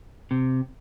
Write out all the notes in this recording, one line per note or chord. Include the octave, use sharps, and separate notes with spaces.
C3